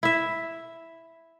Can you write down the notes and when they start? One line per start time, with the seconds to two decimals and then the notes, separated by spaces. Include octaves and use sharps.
0.03 E4 E5